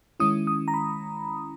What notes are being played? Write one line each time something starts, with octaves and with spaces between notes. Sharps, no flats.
D#3 G#3 C#4 E4 D#6
D#6
A#5
B5